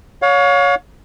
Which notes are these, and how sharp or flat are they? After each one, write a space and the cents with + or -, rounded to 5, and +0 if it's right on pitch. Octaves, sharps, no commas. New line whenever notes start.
C#5 +20 F5 +40